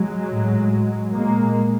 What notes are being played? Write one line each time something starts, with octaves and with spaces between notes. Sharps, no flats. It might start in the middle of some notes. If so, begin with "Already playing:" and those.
Already playing: F#3 G#3
A2
A#2 G#3 A#3